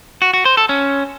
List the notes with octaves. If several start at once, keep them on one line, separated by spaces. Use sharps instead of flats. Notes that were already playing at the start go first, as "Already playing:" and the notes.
F#4
F#4
C5
A4
C#4